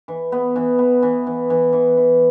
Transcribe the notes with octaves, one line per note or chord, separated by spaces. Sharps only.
E3
B3
E3
B3
E3
E3
E3
E3
E3